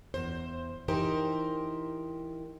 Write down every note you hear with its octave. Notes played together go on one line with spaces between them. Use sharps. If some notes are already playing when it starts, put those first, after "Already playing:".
E2 C5
E3 D#4 G4 A#4 C5